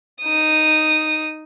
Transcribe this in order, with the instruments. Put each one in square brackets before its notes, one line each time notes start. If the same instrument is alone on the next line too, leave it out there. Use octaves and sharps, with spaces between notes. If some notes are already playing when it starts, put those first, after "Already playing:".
[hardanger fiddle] D#4 D#6